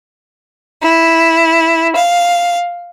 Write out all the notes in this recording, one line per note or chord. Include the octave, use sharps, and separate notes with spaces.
E4
F5